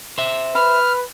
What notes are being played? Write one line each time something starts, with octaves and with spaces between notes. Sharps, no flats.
C5 E5
B4 B5 F6